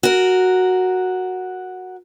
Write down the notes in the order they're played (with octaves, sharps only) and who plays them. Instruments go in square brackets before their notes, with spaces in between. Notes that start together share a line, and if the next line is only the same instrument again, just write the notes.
[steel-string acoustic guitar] F#4 A#4